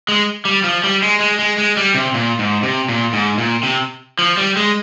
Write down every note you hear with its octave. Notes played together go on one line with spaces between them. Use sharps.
G#3
G3
F3
G3
G#3
G#3
G#3
G#3
G3
C3
A#2
G#2
C3
A#2
G#2
A#2
C3
F3
G3
G#3